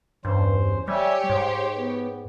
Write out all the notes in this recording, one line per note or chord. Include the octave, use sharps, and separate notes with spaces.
E2 G2 C#4 C5
G3 G4 C#5 D5 E5 G#5
G#2 C5
B3